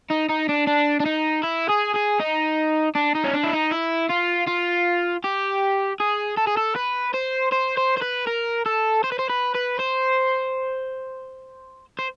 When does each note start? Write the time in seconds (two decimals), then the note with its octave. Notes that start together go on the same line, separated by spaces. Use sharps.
0.11 D#4
0.29 D#4
0.49 D4
0.67 D4
1.00 D4
1.06 D#4
1.43 E4
1.69 G#4
1.94 G#4
2.20 D#4
2.95 D4
3.15 D#4
3.24 C#4
3.33 D4
3.43 E4
3.53 D#4
3.71 E4
4.10 F4
4.48 F4
5.24 G4
6.00 G#4
6.37 A4
6.47 G#4
6.57 A4
6.76 B4
7.14 C5
7.52 C5
7.77 C5
7.98 C5
8.02 B4
8.27 A#4
8.66 A4
9.04 C5
9.12 B4
9.19 C5
9.30 B4
9.55 B4
9.80 C5
11.99 C5